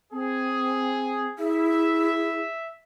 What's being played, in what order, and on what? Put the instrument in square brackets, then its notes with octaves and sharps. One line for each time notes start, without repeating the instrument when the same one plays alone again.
[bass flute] C4 [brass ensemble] G#4
[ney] E4 [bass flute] G#4 [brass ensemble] E5